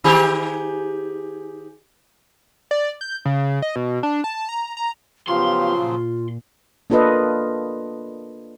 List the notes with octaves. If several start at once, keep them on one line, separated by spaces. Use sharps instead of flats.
D#3 G4 G#4
D5
G6
C#3
D#5
B2
D4
A5
A#5
A#5
C#3 F3 F#3 B3 F4 G4 F5 C6
A#2
A#3 D4 F4 A4 B4 D#5